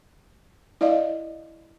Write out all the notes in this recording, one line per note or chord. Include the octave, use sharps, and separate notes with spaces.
E4 D5 D#5 F5